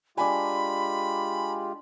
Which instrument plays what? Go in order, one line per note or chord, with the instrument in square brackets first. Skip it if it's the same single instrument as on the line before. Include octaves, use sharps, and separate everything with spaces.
[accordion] G#3 F4 G4 [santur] D4 G#5 [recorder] B5